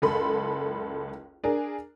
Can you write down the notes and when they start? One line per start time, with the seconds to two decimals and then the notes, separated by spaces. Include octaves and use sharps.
0.02 F#1 C#2 A4 B5 C6
1.44 D4 G#4 A#4